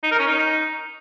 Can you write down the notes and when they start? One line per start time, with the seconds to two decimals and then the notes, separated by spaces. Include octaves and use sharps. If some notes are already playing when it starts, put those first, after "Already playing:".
0.04 D#4
0.11 A#4
0.19 C#4
0.27 D#4